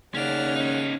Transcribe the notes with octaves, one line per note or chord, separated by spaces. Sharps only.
D#2 C#3 C#4 D5 F#5 F6
C#4 D#4